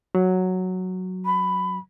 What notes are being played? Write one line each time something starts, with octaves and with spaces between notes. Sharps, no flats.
F#3
B5